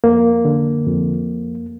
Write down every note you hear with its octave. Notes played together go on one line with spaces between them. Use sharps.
F2 A#3
D3
F2